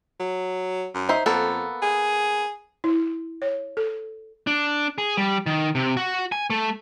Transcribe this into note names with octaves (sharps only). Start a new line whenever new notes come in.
F#3
F#2
D#4 C5 E5
F2 A#3 B3 A4
G#4
E4
C#5
A4
D4
G#4
G3
D#3
C3
F#4
G#5
A3